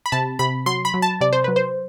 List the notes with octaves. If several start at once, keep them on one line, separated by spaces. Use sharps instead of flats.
B5
C3 A5
C3 B5
F#3 C6
B5
F#3
A5
C3 D5
C5
F#3 B4
C5